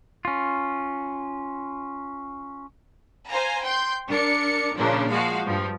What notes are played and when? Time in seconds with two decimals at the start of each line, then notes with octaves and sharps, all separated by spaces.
0.25 C#4 F4
3.30 C5 F5 G#5 A#5
3.62 G5 C6 G6
4.09 D4 A#4 D5 C#7
4.76 A#2 C#3 F3 A#3 D4
5.10 F3 G#3 F#4 F5
5.45 G2 F3